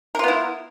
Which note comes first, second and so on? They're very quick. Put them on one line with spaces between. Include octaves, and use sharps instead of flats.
A#4 F4 B3 E4